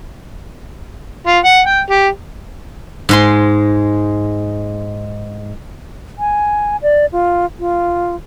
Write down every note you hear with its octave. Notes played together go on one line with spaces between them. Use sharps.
F4
F#5
G5
G4
G#2 G#3 C6
G#5
D5
F4
F4